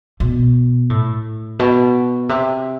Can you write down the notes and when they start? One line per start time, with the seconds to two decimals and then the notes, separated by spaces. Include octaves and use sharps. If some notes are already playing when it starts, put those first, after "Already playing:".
0.20 B2
0.90 A2
1.59 B2
2.29 C3